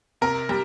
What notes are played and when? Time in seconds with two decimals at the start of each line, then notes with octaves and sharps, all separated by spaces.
0.21 C3 A#4
0.49 G3